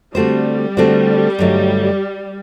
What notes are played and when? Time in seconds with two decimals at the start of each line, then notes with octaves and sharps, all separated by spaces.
0.15 D3 G3 A3 C4 F#4 C5
0.77 D3 A3 C4 F#4 C5
1.39 G2 D3 F#3 A3 D#4